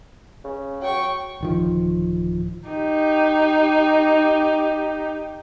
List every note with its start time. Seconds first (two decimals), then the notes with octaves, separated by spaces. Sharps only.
0.44 C#3
0.82 F#3 G5 C#6
1.41 D1 D#3 F3
2.69 D#4 G4